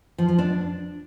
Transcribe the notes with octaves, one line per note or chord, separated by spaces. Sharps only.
F3
F3
D4